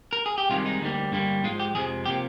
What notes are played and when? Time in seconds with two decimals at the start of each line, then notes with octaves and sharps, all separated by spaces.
0.13 A#4
0.26 G#4
0.38 G4
0.50 C2 C3 D#3 G#3 F4
0.66 D#4
0.81 D2 D3 G3 A#3
1.12 G2 D3 G3 A#3
1.43 G#2 F3 G#3 F4
1.60 G4
1.74 F2 C3 F3 G#3 G#4
2.06 C3 F3 A#3 G4